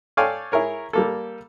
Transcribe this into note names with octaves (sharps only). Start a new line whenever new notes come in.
A4 C#5 D5 F5 G5 G#5
E4 G#4 A#4 C#5
G3 A#3 A4